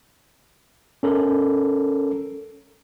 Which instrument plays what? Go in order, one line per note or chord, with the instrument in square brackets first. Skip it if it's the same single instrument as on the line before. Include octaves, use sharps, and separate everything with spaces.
[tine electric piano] C#4 A4 A#4